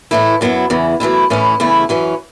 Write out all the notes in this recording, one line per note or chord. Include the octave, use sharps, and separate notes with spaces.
A2 E3 A3 E4
F#2 F#3 B3 E4
E2 C#3 E3
F#2 E3 A3 E4
A2 E3 C#4 E4
E2 C#3 A3 E4
F#2 E3 C#4